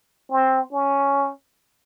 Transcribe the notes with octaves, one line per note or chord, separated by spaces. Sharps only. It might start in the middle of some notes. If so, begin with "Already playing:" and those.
C4
C#4